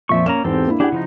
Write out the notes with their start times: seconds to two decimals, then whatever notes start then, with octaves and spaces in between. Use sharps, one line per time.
0.09 F2 A#2 F3 E5 C#6
0.26 A#3 C#4 A#5 E7
0.44 E2 G#2 C4 G4 A4
0.67 A#3 D4 E4
0.80 D4 E4 G4 G#4 F#5
0.92 C#3 F3 D#4